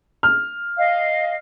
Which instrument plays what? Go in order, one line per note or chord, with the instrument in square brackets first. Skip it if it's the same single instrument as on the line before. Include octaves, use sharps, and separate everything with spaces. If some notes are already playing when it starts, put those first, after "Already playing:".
[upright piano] F6
[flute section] D#5 F5